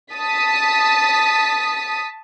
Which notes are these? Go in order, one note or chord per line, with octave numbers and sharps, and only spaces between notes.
A5 D#6 B6